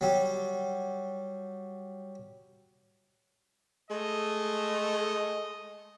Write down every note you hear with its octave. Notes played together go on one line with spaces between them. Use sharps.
F#3 G3
G#3 A3 D#5